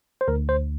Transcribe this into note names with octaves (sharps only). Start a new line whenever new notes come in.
C5
D2 A#4
C5